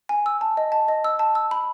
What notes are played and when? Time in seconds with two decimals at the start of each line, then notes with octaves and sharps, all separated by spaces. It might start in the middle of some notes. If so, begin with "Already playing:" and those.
0.09 G#5
0.26 E6
0.41 A5
0.57 D#5
0.72 A5
0.88 D#5
1.05 E6
1.19 A5
1.35 E6
1.51 B5